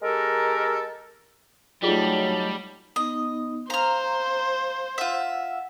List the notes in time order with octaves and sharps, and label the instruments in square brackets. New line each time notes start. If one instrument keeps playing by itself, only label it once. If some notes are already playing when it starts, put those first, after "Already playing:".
[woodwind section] G#3 G4 A4 A#4
[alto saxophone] F#3 [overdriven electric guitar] G3 [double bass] A3 D#4 [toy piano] F4 G#4
[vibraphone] B3 D#4 D#6 [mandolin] D#5
[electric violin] C5 [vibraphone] F5 [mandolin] A#5 F6
[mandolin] F4 E5 [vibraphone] F#5 E6